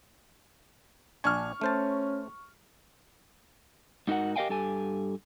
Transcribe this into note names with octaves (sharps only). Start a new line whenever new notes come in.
A#1 D4 G#5 C#6 F6
A3 C#4 C5 A5
G#2 D#4 F#4 A#4 F#5
G4 A#4 D#5 F5 G5 G#5
G2 G4 A4 G#5